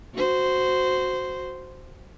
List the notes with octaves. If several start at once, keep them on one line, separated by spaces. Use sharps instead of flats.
F#4 C5